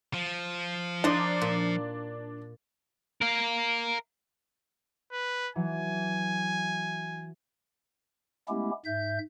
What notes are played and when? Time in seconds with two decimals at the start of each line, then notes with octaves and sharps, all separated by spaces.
0.14 F3
1.04 D4 D#4 A#4 C5
1.42 A#2
3.21 A#4 F5
5.13 B4
5.56 E3 F#3 G#5
8.49 G#3 A3 B3 C#4 E4 G4
8.85 G#2 E5 G6